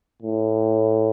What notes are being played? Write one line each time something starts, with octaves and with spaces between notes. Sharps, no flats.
A2